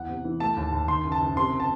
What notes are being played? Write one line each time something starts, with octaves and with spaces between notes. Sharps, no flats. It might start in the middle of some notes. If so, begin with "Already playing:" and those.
Already playing: E2 F#5
C3
E3
A3 A5
D#2
D#2
D#3 C6
F#1
A5
F#1
C3 C6
A5